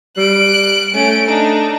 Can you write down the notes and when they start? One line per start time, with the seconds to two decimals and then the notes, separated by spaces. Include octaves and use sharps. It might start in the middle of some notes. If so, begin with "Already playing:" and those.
0.17 G3 F#6 D7
0.94 A3 C#4 D7
1.28 D4 D#4